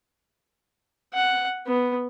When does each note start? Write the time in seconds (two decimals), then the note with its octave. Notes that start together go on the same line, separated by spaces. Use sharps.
1.14 F#5
1.66 B3